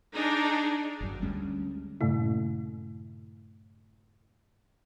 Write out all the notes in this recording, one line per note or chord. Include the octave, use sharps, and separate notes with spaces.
D4 D#4 G#4
G1 F#2
D2 G3 G#3 C#4
G2 A#2 C#3 A3 E4